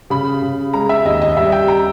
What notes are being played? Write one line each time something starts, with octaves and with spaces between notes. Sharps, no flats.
C#3 B5
C#3
G#3 A#5
E5
D#2 D#5
D#5
G3 E5
G5
A#5